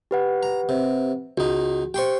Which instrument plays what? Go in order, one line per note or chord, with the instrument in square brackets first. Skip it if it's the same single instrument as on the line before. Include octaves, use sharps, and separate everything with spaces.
[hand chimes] G4 B4 F#5
[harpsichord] A#5
C3
[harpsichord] C#2 D#4 [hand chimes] F#4
[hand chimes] G4 C5 [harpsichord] G5 C6 C#6